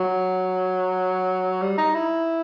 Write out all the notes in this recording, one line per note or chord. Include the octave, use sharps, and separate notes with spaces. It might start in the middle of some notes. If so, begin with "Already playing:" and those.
Already playing: F#3
G3
D#4
E4